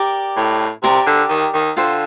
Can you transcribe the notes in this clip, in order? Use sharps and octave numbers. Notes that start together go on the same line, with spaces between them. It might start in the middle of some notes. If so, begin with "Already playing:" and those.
Already playing: G4 A#4 D5
A2
C3 G4 A#4 D5
D3
D#3
D#3
D3 F4 C5 G5